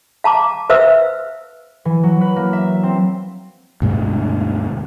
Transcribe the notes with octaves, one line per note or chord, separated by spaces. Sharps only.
F5 A5 A#5 D6
B4 C5 E5 F5 E6
E3
F#3
B4
A#3
E5
C4
D2 G2 B2 G#3